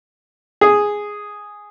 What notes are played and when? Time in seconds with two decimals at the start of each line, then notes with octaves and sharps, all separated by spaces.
0.61 G#4